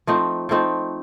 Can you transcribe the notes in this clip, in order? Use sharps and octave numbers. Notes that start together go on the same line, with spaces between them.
F3 A3 C4 D#4
F3 A3 C4 D#4